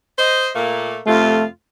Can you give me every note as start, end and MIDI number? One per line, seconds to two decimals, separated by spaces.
0.18 0.48 72
0.18 0.48 75
0.54 0.97 46
0.54 0.97 57
0.54 0.97 58
1.06 1.46 41
1.06 1.46 48
1.06 1.44 57
1.06 1.46 65